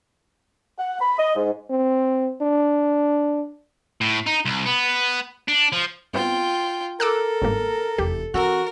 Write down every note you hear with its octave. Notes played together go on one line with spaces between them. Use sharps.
F#5
B5
D#5
G#2
C4
D4
A2
D#4
C2
B3
D4
F3
G2 B3 C4 F4 G5
A4 A#4 D6 E6 F#6
G1 G#2 A#3
F1 E2 G4
E3 C4 F#4 A#4 E6